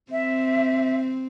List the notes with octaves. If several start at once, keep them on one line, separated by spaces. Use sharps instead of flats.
C4 E5